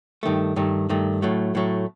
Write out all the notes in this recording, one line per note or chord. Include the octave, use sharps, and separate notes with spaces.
G2 D#3 A3
G2 D#3 A3
G2 D#3 A3
A2 F#3 A3
A2 F#3 A3